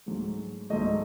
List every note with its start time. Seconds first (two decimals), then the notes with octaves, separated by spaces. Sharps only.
0.06 G#2 F#3 A3
0.70 G#2 F#3 A3 D#5